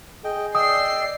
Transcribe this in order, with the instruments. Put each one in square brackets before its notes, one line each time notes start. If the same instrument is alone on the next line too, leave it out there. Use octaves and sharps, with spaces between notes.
[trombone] G#4 [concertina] D#5 G5
[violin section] D5 C7 [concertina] D#5 G5 E6 [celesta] D#6